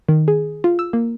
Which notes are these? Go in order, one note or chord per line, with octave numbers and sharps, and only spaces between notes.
D#3
G#4
F4
E6
A#3